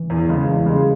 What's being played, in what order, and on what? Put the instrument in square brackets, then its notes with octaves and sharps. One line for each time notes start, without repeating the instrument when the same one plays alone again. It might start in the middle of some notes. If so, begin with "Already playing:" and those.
Already playing: [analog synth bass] E3
[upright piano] E2
C#3 G#3
E2
C#3 G#3